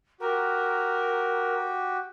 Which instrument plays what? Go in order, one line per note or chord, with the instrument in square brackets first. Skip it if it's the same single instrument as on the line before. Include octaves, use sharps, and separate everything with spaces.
[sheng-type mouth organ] F#4 G4 [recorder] A#4